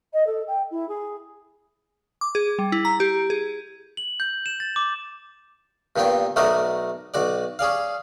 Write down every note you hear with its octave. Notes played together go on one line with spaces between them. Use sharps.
D#5
A4
G5
E4
G#4
D6
G#4
G3
E4
A#5
G4
G#4
F#7
G6
E7
A6
D6
G2 A#2 B3 C4 C#5 G5
B1 A3 F#4 A#4 D5 D#6
B1 F#4 D5
C#4 G#4 D5 F5